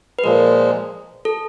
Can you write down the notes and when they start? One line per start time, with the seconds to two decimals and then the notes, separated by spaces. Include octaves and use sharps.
0.19 B4
0.24 A#2 F3 G#3 A#4
1.25 A4